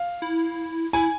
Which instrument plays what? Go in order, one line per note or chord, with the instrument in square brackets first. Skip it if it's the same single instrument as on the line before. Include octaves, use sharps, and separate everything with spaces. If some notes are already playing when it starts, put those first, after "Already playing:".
Already playing: [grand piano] F5
[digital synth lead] E4
[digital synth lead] E4 [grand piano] G#5